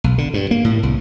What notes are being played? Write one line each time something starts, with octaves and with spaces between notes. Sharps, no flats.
B1
D3
G2
A#3
A2
C2